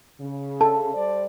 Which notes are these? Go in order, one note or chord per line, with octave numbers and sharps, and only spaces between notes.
C#3
A4 A5
G3 C5 D5